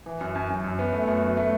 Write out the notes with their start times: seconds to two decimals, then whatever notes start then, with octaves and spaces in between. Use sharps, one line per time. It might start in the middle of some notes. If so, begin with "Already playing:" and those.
0.06 E3
0.21 F#2
0.35 F#2
0.50 F#2
0.64 F#2
0.79 B3
0.93 A3
1.07 F#2
1.22 F#3
1.37 A3